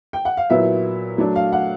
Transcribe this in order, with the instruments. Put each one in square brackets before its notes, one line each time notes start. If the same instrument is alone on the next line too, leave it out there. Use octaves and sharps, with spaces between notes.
[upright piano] G5
F#5
F5
A#2 F#3 B3 E4 E5
F#3 A3 D4
F5
F#5